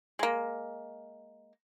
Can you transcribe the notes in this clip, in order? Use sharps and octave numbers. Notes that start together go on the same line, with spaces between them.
G#3 A#3